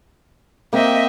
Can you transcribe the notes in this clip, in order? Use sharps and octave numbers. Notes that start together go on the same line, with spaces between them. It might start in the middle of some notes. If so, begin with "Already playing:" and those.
A#3 C4 D#5 E5 G5